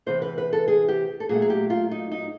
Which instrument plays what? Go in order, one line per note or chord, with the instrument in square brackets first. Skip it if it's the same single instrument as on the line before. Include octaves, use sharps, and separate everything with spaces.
[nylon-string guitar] E2 C3 E3 C5
B4
B4
A4
G#4
G4
A4
A#2 F#3 A3 G#4
G#4
G4
F4
D#4
D#4